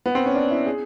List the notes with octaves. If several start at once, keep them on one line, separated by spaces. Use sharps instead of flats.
B3
C4
C#4
D4
E4
G#4